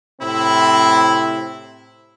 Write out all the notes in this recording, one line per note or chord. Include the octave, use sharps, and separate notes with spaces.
A2 C3 C4 E4